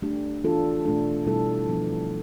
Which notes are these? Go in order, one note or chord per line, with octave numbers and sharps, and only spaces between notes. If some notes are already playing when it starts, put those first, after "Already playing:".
A3 D4 G4
E3 B3 D4 F4 A4
B2 A3 D4 A4
B2 G3 B3 E4 A4
D3 F3 B3 D4